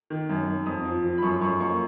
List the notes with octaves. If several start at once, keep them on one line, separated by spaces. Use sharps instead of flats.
D#3
F#2
F#2
F2 D#6
F3
F3
B5
F#2 C#6
F#2 C#6
A#3 C#6